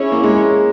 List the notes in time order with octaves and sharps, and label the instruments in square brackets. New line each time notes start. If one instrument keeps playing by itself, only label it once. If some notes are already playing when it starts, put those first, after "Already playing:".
Already playing: [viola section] C#4 E4 G#4 C#5
[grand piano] A#3
G#3